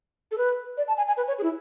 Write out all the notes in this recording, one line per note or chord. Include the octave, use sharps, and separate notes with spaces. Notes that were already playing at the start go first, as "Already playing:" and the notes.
A4
B4
D5
A5
G#5
G#5
B4
C#5
G#4
E4